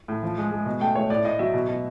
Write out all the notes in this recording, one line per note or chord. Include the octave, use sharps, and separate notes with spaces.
A2
F3
G#3
G#3
B2
A3 G5
A3 C#5
A2 D5
A2 D#5
F#3 E5
B2
B2